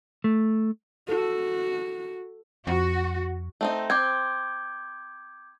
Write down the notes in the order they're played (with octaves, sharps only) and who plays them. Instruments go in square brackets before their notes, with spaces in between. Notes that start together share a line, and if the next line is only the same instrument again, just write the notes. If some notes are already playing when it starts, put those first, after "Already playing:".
[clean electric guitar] A3
[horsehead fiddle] F#4 [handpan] A4
[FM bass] F2 [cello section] F#4
[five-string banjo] A3 C4 D#4
[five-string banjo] C4 [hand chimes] D6 G6 G#6